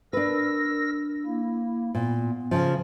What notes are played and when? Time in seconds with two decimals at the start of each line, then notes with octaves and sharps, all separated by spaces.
0.13 D4 A#4 B4 E6 A#6
1.26 A#3 E4
1.95 A#2 B3
2.51 C#3 F3